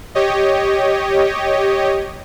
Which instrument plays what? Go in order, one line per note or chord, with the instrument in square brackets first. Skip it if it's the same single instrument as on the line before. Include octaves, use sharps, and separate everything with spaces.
[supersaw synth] G4 C#5 D#5